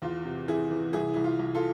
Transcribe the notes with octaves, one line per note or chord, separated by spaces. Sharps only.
E2 F4
C3
E3 E4 G#4
E3
C2 E4 G#4
C2 E4
F4
C2
F4 A4